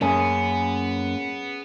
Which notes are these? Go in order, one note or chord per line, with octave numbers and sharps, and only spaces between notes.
F#2 A#3 B3 C#4 G#4